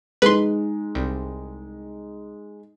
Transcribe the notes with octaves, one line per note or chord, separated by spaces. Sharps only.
G#3 D#4 B4 C6
C2